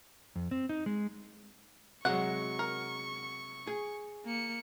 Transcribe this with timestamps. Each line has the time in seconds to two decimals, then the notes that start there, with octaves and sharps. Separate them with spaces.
0.36 F2
0.51 C4
0.69 D#4
0.86 G#3
2.05 C3 F#3 G#3 F#4 F#5 C#6
2.59 A#4
3.67 G#4
4.26 A#3 C#7